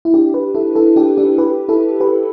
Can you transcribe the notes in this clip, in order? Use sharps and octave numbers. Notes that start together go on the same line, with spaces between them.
E4
D4 G4
G4 B4
E4 A4
E4 A4
D4 G4
D4 G4
G4 B4
E4 A4
G4 B4